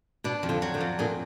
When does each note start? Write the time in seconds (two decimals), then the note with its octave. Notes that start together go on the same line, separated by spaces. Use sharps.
0.24 B2 D4
0.43 F2
0.49 D3 F3
0.62 F#3
0.74 D3 F3
0.80 F2
0.99 A#2 D3 G#4